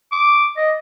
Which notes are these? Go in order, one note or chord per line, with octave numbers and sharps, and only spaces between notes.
D6
D#5